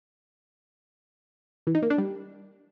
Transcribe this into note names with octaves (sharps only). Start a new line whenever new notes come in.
E3
D#4
A#3
D4
G3